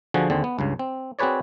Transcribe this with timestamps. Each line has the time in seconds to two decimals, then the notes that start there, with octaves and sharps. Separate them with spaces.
0.14 D3 F3 F#4 G#4
0.30 D#2 D3 C4 G#4
0.44 B3
0.59 C#2 G2 C#3
0.79 C4
1.19 C4 F#4 G#4 B4 C#5 D5